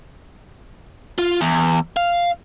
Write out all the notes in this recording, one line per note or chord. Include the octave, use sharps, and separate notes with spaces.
F4
E2
F5